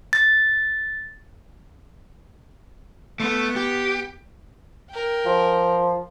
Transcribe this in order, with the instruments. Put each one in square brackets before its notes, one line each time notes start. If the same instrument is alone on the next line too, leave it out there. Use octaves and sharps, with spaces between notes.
[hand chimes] A6
[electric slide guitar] A3 [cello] B3
[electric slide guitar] G4
[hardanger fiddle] A#4 G5
[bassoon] F3